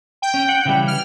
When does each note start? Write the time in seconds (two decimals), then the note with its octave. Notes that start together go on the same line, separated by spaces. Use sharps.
0.22 G5
0.34 C#4
0.49 F#5
0.65 C#3 E3 G3
0.88 F6